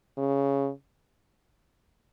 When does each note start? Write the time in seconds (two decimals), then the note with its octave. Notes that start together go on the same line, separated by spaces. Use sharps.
0.18 C#3